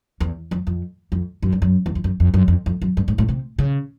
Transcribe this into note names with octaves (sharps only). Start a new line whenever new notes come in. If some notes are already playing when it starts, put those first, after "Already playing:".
E2
F2
F2
F2
F#2
G2
F#2
E2
F2
F#2
F2
F#2
F2
F2
F#2
G2
G#2
A2
C3
C#3